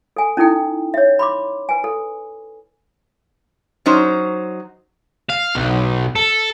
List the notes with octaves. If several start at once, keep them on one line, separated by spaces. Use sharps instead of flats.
A4 G#5
C#4 D#4 E4 A4 G5
C#5 E5
B5 C6 D6
B4 G#5
A4
F#3 C#4 D#4 C5
F5
B1
A4